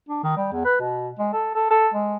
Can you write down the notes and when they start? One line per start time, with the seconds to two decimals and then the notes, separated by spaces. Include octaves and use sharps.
0.09 D4
0.24 D#3
0.37 G3
0.52 E2
0.65 B4
0.80 B2
1.19 G#3
1.33 A4
1.55 A4
1.71 A4
1.94 G#3